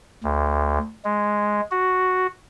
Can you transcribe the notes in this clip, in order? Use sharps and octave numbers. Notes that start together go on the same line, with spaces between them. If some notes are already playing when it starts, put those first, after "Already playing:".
D2
G#3
F#4